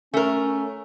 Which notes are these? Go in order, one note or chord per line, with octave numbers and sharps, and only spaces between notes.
A3 C#4 A#4